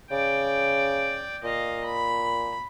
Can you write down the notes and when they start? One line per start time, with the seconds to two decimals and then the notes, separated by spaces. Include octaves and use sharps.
0.11 C#3 D5 G5
1.43 A#2 D#5 F5
1.84 B5